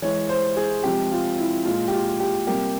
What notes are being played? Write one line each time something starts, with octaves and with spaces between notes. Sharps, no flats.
E3 G#3 C#5
C5
G#4
C3 F3 G#3 G4
F4
E4
A#2 G#3 F4
G4
F4
G4
C3 G3 A#3 G4